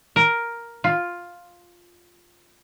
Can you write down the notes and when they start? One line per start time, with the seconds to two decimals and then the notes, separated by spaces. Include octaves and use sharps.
0.16 A#4
0.84 F4